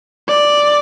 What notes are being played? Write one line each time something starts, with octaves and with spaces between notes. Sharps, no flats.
D5